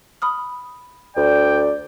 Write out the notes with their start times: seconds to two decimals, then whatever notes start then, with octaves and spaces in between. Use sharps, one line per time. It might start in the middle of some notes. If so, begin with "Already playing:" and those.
0.22 B5 D#6 F6
1.17 D2 D5 G5